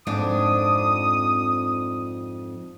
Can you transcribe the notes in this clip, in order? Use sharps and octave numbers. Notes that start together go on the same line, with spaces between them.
F2 G#2 D4 D#6